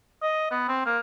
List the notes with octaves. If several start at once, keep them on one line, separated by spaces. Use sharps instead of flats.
D#5
B3
C4
A#3